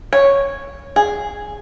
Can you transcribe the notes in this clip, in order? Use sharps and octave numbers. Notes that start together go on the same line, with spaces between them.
C#5
G#4